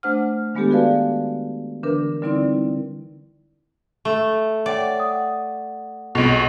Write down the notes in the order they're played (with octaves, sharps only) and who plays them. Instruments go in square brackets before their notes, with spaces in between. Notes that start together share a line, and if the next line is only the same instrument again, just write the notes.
[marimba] A3 D4 C5 F#5 F6
D#3 G#3 B3 D4 G4 A4
F#4 G#4 B4 D5 F5 A5
D3 E3 D4 A#4 B4
D3 G3 C4 D#4 E4 D5
[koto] A3
[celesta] C#5 F#5 G5 [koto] D5
[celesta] F#5 D#6
[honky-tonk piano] B1 B2 [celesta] F4 G#4 F7